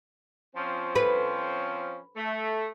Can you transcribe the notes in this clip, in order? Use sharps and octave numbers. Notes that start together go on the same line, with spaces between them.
F3 C4 C#4
B4
A3